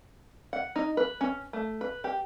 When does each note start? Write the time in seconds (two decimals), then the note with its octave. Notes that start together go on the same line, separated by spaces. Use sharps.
0.53 F#5
0.76 D#4
0.97 B4
1.21 C#4
1.53 A3
1.81 B4
2.04 G4